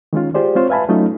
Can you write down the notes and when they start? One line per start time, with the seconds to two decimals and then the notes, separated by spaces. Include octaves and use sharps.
0.13 D#3 G#3 C#4 F4
0.34 F4 G4 G#4 C5 D5
0.55 G#3 C4 F4 C5 C#5
0.69 B4 E5 F5 G#5 A5 B5
0.89 F#3 A3 C#4 D#4 F4 D#5